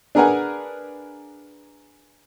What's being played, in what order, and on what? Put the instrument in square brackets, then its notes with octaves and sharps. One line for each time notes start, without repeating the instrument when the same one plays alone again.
[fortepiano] D4 G#4 A#4 B4 F#5 G#5